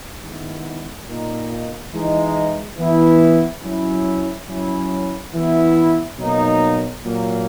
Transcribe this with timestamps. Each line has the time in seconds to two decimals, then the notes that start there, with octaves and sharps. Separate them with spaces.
0.22 D#3 G#3 B3 E4
1.07 A#2 A#3 D#4
1.92 E3 G#3 D#4
2.78 E3 B3 E4
3.63 F#3 C#4 E4
4.48 F#3 C#4 E4
5.33 E3 B3 E4
6.18 B2 F#3 A#3 D#4
7.03 A#2 F#3 A#3